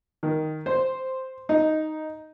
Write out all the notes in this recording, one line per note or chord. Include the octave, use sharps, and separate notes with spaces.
D#3
C5
D#4